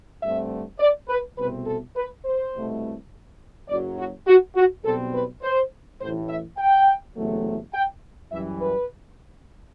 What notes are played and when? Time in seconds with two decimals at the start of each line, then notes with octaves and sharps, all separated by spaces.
0.22 G2 D3 A3 C4 E5
0.80 D5
1.09 B4
1.38 C2 B2 A3 C4 B4
1.67 A4
1.96 B4
2.24 C5
2.54 C2 B2 A3
3.69 F#1 F#2 F#3 D5
3.98 F#4
4.27 F#4
4.56 F#4
4.85 B1 B2 G3 C4 A4
5.14 B4
5.43 C5
6.00 A1 A2 E3 C5
6.29 E5
6.58 G5
7.16 F#1 E2 C3 F#3 A3
7.74 G5
8.32 F#2 E3 G3 E5
8.61 B4